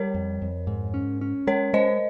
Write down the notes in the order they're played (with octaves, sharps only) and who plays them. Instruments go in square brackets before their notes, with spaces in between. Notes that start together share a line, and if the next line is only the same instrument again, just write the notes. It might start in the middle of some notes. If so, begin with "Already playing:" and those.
Already playing: [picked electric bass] G3 [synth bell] A#4 C#5
[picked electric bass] F2
F2
G#2
C#4
C#4
[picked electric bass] G#3 [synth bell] A#4 C#5
[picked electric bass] G#3 [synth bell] C5 D#5